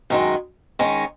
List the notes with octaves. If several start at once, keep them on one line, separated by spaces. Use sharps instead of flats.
F#2 D#3 G#3
D#3 G#3 C#4